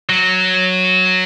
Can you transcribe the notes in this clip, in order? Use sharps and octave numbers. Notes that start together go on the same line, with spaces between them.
F#3